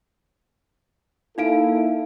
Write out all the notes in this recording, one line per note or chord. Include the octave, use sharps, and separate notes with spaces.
A#3 D#4 E4 A4 F5 D7